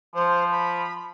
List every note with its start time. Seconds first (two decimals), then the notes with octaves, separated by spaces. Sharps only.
0.15 F3 C5
0.52 B5